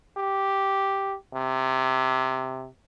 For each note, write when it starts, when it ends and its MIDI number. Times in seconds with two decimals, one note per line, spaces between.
0.18 1.16 67
1.34 2.67 48